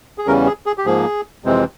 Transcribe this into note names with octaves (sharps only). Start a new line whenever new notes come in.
G#4
E2 C#3 E3 G3 C#4 A#4
G#4
G#4
G4
G#2 F3 A#3 G#4
F2 C3 E3 G#3 C4